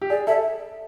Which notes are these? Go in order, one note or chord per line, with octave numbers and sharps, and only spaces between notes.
G4
G#4 D5
A4 E5